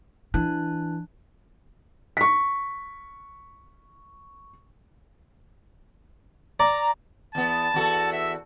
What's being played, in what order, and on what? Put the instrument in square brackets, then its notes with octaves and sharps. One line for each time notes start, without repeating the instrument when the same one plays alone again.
[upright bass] E3 [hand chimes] D4 A5 F#6
[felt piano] C#6 B6
[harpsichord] D5 [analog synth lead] A#5
[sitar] E2 B3 [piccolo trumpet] A5
[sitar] E2 F#4 A4
[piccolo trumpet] E5